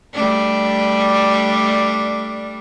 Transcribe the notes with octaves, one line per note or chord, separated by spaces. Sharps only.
G3 A3 D4